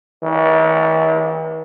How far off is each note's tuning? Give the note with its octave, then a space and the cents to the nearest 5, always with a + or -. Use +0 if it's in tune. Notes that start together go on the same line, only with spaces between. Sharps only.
E3 -45